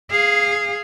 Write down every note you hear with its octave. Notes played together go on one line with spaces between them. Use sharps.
G#4 F5